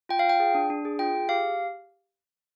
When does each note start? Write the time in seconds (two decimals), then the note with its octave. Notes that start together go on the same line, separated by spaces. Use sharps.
0.09 F4 G5
0.19 F5
0.24 F4
0.29 G5
0.40 G#4
0.55 D4
0.70 D4
0.85 G#4
0.99 F4 G5
1.15 G#4
1.29 G4 F5